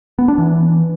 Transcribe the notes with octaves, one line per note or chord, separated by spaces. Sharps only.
B3
D4
E3